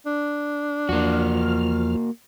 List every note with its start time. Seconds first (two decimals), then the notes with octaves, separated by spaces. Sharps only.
0.06 D4
0.89 E2 F3 A#3 F#4 F6